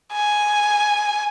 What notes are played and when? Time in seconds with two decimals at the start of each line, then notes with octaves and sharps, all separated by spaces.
0.13 G#5